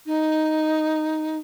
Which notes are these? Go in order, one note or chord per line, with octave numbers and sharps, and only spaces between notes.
D#4